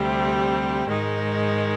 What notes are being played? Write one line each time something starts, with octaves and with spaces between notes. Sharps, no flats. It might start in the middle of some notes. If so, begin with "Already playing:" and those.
Already playing: D2 C3 G3 C4
G#2 D#3 G#3 D#4